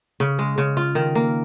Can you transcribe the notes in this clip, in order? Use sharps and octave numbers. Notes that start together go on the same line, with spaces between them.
C#3
G#3
C#3
F4
D#3
A#3